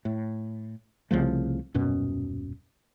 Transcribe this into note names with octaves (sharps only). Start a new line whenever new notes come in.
A2
C2 C#3 F3 A3
D#1 F#2 B2 C#4